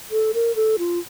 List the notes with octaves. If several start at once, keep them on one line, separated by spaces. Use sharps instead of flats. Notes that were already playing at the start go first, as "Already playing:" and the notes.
A4
A#4
A4
F4